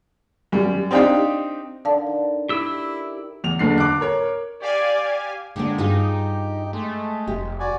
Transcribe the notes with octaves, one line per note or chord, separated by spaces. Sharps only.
F#2 G3
C4 D4 D#4 G4 F5 G5
D3 D#3 D5 F5 A5
D#3
E4 G4 E6
E2 F7
F#1 D3 C7
D6 F#6
A#4 C#5
G4 D5 F5 G#5
D3 G#3 A#3 G4 D5
G2 D#4 F4 G#4
G#3 A3
F1 G4
F#4 D5 G#5